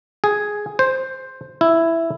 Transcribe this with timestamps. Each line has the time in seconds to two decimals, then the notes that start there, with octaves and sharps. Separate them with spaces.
0.24 G#4
0.79 C5
1.61 E4